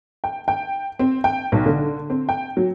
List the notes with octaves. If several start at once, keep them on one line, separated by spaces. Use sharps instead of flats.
G5
G5
C4
G5
B1
D3
C4
G5
F#3